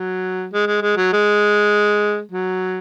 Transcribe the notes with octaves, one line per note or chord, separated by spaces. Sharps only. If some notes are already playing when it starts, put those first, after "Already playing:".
Already playing: F#3
G#3
G#3
G#3
F#3
G#3
F#3